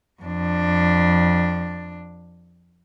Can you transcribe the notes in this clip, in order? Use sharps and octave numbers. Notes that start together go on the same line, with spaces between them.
F2 D4